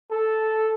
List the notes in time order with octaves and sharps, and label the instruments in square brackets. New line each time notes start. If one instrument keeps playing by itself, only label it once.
[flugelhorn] A4